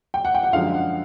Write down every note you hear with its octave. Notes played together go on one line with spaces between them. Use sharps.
G5
F#5
G5
F#5
F#2 D3 F3 G#3 F5
F#5